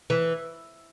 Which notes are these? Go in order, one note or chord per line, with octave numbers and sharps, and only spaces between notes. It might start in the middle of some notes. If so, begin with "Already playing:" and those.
E3